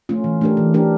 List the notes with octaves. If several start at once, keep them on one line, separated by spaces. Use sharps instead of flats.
A3 C#4 F4
E3
A3 D4 G4 A#4
E3
A3 D4 G4 A#4